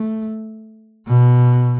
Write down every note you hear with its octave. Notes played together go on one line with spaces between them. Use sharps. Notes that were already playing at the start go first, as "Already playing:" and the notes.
Already playing: A3
B2